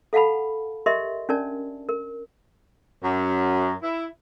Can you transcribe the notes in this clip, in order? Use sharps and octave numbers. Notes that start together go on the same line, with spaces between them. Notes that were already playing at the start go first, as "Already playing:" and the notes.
A4 F5 F#5 A5 B5
G4 A#4 D#5 E5 C6
C#4 D4 A#4 D5 A5
A#4
F#2
E4